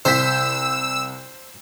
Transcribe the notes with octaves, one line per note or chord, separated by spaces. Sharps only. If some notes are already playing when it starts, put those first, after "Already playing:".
C2 C5 E6 G6 B6